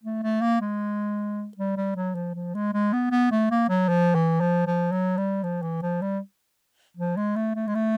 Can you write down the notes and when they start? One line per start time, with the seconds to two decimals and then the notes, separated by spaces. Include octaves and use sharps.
0.04 A3
0.23 A3
0.41 A#3
0.61 G#3
1.57 G3
1.77 G3
1.96 F#3
2.15 F3
2.35 F3
2.55 G#3
2.74 G#3
2.93 B3
3.11 B3
3.31 A3
3.51 A#3
3.69 F#3
3.89 F3
4.15 E3
4.40 F3
4.67 F3
4.92 F#3
5.17 G3
5.43 F3
5.62 E3
5.82 F3
6.02 G3
6.97 F3
7.17 G#3
7.36 A3
7.55 A3
7.67 G#3
7.75 A3